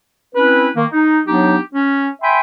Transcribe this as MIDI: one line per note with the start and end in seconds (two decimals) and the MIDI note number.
0.35 0.69 60
0.35 0.69 61
0.35 0.69 64
0.35 0.69 71
0.75 0.85 51
0.75 0.85 58
0.91 1.20 63
1.26 1.58 54
1.26 1.58 59
1.26 1.58 62
1.26 1.58 63
1.26 1.58 67
1.73 2.08 61
2.22 2.40 76
2.22 2.40 79
2.22 2.40 80
2.22 2.40 83
2.22 2.40 84